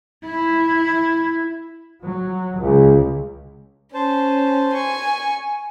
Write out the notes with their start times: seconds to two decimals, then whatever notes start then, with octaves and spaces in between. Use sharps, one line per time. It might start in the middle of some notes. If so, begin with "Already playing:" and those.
0.25 E4
2.02 F#3
2.58 C#2
3.94 C#4 C5 A5
4.74 G#5 C#6